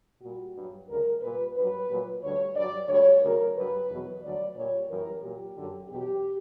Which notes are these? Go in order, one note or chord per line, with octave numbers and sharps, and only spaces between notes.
A#2 G3 F#4
G2 F#3
D2 C#3 G3 A#4
A#2 G3 B4
G2 F#3 B4
A#2 F#3
D2 D3 G3 C#5
G2 F#3 D5
D2 D3 G3 C#5
D2 C#3 F#3 A#4
G2 F#3 B4
E2 B2 F#3
D2 D3 F#3 D5
A#2 G3 C#5
F#2 E3 G3 A#4
A#2 F#3 G4
F#2 D3 F#3
E2 B2 F#3 G4